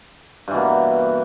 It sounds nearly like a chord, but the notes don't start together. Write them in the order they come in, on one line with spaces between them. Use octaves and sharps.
G2 E3 B2 A#3